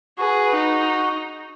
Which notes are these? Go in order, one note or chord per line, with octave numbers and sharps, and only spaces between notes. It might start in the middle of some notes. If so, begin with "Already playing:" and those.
F#4 G#4 B4
D#4